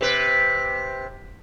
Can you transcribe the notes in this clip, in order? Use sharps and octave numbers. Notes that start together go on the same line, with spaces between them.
C3 B4